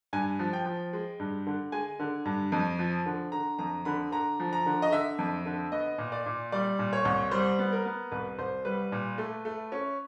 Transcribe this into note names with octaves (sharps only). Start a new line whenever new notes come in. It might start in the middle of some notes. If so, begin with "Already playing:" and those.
G2 G#5
F3
G5
F3
G#3
G2
D3
G#3 G#5
D3
G2
F2
F3
D3
D3 A#5
F2 A#5
D3 B5
D3 A#5
F3
A#5
D3
D#5
D3 E5
F2
D3
B3 D#5
A#2
D5
A#2
G3 D5
A#2
C#5
C2
G3 C5
B3
A#4
B3
C2 B4
C2 C5
G3 B4
A#2
A3
A3
C#4